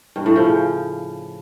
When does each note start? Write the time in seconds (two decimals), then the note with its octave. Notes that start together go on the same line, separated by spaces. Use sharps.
0.16 G2
0.26 A2
0.36 F3
0.46 C#3